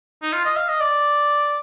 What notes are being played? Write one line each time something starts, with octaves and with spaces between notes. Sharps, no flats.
D#4
F4
D#5
F5
D#5
D5